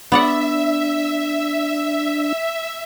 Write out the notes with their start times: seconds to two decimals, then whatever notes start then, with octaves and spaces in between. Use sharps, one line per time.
0.12 B3 D4 D5 E5 F#5